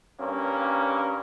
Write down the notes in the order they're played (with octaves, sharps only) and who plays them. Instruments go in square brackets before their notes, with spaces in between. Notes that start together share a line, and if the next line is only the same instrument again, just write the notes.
[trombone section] G2 A#3 C#4